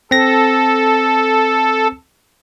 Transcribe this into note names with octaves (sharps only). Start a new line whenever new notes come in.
C4 A4 A#6